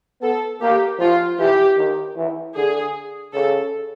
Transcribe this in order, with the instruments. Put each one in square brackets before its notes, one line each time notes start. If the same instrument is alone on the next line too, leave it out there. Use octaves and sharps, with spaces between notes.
[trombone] B3 [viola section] A4
[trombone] A#3 [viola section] G4
[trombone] F3 [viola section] F4
[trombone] E3 [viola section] G4
[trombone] D#3
E3
[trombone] D3 [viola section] G#4
[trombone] C#3 [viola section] A4